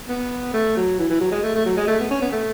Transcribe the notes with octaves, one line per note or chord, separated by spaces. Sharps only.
B3
A3
F#3
E3
E3
F#3
G#3
A3
A3
F#3
G#3
A3
B3
C#4
B3
A3